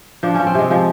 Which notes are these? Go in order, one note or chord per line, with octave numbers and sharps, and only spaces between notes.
F3 D4
F3 C#4
C4
C3 G#3
F3 G#3